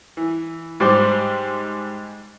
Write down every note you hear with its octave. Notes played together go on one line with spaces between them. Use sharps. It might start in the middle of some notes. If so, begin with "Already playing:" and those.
E3
G#2 G3 G4 C5 D6